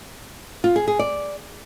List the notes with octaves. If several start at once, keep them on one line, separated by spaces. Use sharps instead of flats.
F4
G#4
G#4
D5